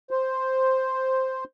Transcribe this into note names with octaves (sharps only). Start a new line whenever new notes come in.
C5